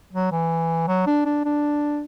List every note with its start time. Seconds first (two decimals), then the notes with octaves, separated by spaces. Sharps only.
0.13 F#3
0.31 E3
0.87 F#3
1.07 D4
1.26 D4
1.45 D4